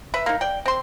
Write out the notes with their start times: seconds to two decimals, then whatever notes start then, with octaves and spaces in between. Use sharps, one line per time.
0.14 B4 E5
0.26 A#3 D#4
0.41 D5 G5
0.66 C4 C6